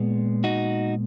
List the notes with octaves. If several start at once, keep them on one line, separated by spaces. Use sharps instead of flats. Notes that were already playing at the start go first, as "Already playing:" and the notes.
Already playing: A#2 G#3 B3
D#4 F#4